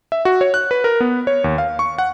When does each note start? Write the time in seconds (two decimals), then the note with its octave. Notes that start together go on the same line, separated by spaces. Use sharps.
0.12 E5
0.25 F#4
0.41 C#5
0.54 F#6
0.71 B4
0.84 A#4
1.00 B3
1.27 C#5
1.44 D#2
1.58 F5
1.79 C#6
1.98 F#5